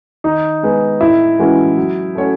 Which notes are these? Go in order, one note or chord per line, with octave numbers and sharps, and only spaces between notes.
D#3 D#4
G#3 B3
A2 E4
E3 G#3 C#4 F#4
F#3
A3 C#4 F#4 C#5